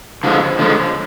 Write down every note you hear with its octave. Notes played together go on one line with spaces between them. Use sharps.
D3 F3 G#3
D3 F3 G#3